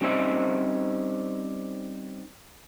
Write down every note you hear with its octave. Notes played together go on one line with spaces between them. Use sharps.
G3 C4 C#4 D#4 C5 E5